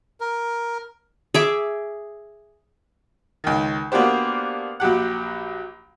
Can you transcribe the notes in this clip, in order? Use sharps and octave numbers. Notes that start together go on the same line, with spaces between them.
A#4
G#4 E5 D6
C#2 D#3
A#3 B3 D4 F#4 G4 C5
A#1 F#3 G4 F#5